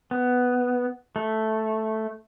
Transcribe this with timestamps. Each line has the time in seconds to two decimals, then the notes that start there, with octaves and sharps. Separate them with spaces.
0.11 B3
1.16 A3